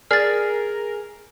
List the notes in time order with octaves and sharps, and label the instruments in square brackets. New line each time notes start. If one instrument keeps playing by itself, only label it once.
[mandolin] G#4 [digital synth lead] A#4 [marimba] D5 [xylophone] F6 A6